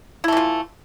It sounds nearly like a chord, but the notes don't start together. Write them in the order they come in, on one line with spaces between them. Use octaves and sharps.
E4 A3 E3 F4